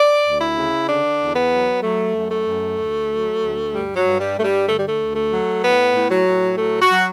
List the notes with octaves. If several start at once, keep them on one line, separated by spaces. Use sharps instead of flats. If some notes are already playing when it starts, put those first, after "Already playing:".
Already playing: D5
D2
E4
C#3
D3 D4
E2
B3
F#3
F#3 A3
F#2
A3
F#2
D2
F#3
D2
G2 G3
F#3
G2
G3
G2 A3
G3
D3 A3
G3
A3
D2
A3
F#3
A2 B3
A2
F#3
A2
F#3 A3
F#4
F#3